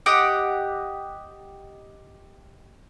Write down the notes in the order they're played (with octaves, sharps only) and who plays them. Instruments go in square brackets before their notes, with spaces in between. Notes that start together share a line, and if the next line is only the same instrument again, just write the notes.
[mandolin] G4 D#5 F#5 G5